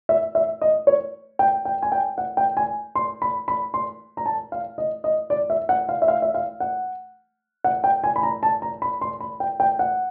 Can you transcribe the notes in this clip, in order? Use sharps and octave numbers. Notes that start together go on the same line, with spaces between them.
E5
E5
D#5
C#5
G5
G5
G#5
G5
F#5
G5
G#5
C6
B5
B5
C6
A#5
A5
F5
D#5
D#5
D5
E5
F#5
F5
E5
F5
E5
F5
F#5
F#5
G5
G#5
B5
A#5
A5
A#5
B5
C6
B5
G5
G5
F#5